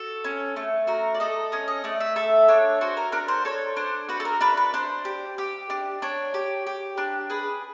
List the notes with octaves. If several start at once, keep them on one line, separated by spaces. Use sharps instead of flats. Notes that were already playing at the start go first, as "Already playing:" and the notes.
Already playing: F#4 A4
C#4
A3
F#4 A#4
D5
A4 D#5
C#4 D#5
D#5
A3 D5
E5
A4 E5
D4 C#5
F#4 C5
A#4
D4 A#4
C5
A4 C#5
D4 C5
F#4 B4
A4
A#4
D4 B4
B4
D4 C5
G4
G4
D4
D4 C#5
G4
G4
D4
G#4 B4